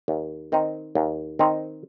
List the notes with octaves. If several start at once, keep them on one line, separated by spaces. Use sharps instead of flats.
D#2
D#3 C4 D#4
D#2
D#3 C4 D#4